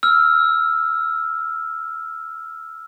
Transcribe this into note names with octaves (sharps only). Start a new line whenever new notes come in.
E6 F6